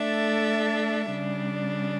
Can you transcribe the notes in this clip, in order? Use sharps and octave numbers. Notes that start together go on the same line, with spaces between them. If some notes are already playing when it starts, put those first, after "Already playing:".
Already playing: A3 D4 A4 E5
C#3 G3 D4